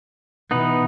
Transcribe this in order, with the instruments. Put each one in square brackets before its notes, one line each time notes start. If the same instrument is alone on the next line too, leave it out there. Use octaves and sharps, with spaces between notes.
[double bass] B2 E3 [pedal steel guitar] B3 D#4 B4